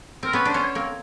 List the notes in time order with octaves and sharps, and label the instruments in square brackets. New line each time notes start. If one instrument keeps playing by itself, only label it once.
[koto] C4 [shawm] A#4
[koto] B3 C#4 [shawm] B4
[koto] D4 [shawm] C5
[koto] B3 C#4
[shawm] C#5
[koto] A#3 C4